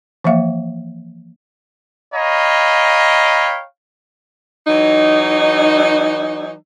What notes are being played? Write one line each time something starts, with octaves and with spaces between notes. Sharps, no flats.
E3 F3 A#3 E5 F5
C#5 D#5 F5 G5 A#5 B5
E3 F#3 D#4